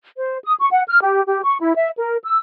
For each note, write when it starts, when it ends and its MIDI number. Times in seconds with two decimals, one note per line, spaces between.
0.17 0.37 72
0.44 0.53 87
0.58 0.67 85
0.71 0.81 78
0.88 0.99 89
1.01 1.21 67
1.26 1.41 67
1.44 1.55 85
1.60 1.73 64
1.75 1.89 76
1.98 2.16 70
2.23 2.39 88